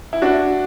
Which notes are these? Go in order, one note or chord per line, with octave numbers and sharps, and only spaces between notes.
E4
D4 F#4